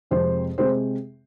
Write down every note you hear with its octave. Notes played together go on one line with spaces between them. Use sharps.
F2 C3 G#3 C4 C5
C3 G#3 C4 C5